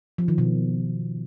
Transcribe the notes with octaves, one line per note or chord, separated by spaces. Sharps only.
F3
D#3
B2